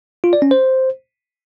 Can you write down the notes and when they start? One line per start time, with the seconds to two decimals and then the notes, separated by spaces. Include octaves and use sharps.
0.24 F4
0.33 D5
0.42 C#4
0.51 C5